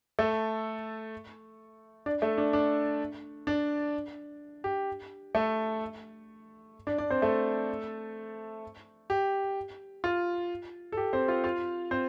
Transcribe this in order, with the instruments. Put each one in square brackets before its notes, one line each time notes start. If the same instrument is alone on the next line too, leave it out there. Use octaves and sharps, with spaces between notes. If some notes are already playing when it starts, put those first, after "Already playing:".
[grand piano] A3 A4
D4 D5
A3 A4
D4 D5
D4 D5
D4 D5
G4
A3 A4
D4 D5
D4 D5
C4 C5
A3 A4
G4
F4
A4
G4
C4 C5
F4 F5
F4 F5
C4 C5